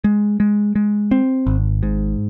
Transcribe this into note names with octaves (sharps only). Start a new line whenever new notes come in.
G#3
G#3
G#3
C4
G#1
G#2